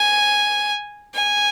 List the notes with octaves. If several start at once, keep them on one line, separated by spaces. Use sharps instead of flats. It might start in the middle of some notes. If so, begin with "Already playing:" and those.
Already playing: G#5
G#5